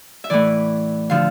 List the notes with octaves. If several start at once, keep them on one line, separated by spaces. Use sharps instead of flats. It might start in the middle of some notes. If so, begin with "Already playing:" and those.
E5
A2 E3 D5
D3 F3 F5